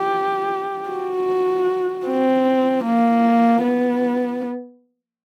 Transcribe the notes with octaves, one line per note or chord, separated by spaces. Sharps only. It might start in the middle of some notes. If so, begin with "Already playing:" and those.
Already playing: G4
F#4
C4
A#3
B3